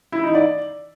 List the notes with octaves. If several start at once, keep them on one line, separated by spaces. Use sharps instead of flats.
E4
D#4
D5